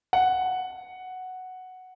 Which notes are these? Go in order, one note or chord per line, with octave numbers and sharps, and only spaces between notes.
F#5